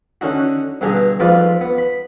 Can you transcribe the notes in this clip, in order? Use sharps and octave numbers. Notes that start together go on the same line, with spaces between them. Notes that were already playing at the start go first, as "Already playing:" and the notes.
D3 C#4 D#4 F#4
G2 B2 D3 G4 G#4 A#5
F2 G#2 F4 B4 D5 D#6
B3
B5